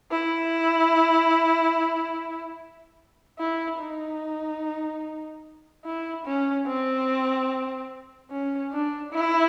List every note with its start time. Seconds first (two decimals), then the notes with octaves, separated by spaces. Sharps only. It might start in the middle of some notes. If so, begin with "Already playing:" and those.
0.11 E4
3.39 E4
3.80 D#4
5.85 E4
6.25 C#4
6.66 C4
8.30 C#4
8.72 D4
9.12 E4